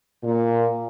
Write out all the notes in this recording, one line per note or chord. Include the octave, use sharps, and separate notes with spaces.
A#2